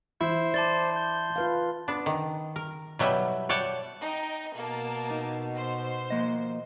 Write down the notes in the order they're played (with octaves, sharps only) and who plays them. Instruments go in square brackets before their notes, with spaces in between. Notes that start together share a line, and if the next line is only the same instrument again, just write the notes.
[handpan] E3 [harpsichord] E4 [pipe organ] C5
[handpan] D5 [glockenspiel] A5 C6 A6
[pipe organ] G6
[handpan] F4 B4 F5
[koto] B3 D4
D#3
A#4
B2 F#3 G3 E4 G5 G#5
C#5 D5 F#5 G5 A5
[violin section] D#4 G5
[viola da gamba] B2 [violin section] A#3 A5
[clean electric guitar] D#4
[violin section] C5
[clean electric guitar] F3 A#3 D#5